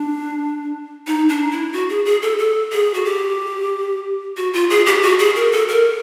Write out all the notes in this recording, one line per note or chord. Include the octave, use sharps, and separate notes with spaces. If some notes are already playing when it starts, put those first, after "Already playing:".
Already playing: D4
D#4
D4
E4
F#4
G#4
G#4
A4
A4
G#4
F#4
G4
F#4
F4
G#4
G4
F#4
G#4
A#4
A4
A#4